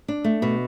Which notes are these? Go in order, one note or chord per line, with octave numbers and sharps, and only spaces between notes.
D4
A3
B2